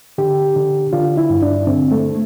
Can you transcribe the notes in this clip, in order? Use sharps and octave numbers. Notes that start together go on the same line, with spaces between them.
D3 G4
D3
D3 F4
E4
G2
D4
D3 C4
A3